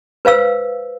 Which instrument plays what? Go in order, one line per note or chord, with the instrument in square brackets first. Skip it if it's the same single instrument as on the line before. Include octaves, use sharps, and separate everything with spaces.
[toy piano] B4 C5 F5 E6